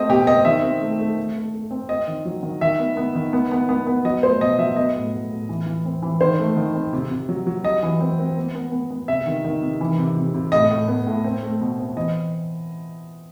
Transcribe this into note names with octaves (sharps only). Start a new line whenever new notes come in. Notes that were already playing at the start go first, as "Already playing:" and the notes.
Already playing: A3 C4 D#5
B2 G4
C4 D#5
D#3 E5
C4
A3
A3
A3
A3
A3
C4
C4 D#5
D#3
F#3
D#3
D#3 E5
B3
B3
D#3
B3
B3
B3
B3
F#3 D#5
A3 C5
B2 D#5
F#3 E5
B3 D#5
A2
A2
A2
E3
E3
C4
E3
D#3 C5
A3
D#3
C4
C3
C3
F#3
F#3
G3 D#5
E3
C4
C4
B3
B3
B3
B3
C3 E5
D#3
D#3
C3
E3
C3
C3
C3
A2 D#5
A2
B3
A2
C4
A3
B2
C4
E3 D#5